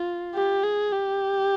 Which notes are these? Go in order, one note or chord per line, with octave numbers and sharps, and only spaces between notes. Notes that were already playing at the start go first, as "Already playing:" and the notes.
Already playing: F4
G4
G#4
G4